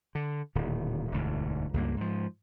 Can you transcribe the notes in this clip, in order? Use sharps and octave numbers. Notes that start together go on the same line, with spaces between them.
D3
D1 A#2 D#3
E1 D2 G#2
C#2 G2 A#3
G#2 F3